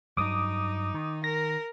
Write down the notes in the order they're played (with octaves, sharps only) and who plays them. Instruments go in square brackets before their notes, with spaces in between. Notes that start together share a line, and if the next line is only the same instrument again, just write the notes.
[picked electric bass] G2 F#3 [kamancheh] D#4 [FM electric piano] D6 D#6
[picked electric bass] D#3
[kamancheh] A#4 [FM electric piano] A#6